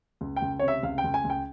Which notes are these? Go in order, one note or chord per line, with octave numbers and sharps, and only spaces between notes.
C#2
G5
C#2
C#5
C3
E5
C#2 F5
G5
C#2
G#5
C#2
G5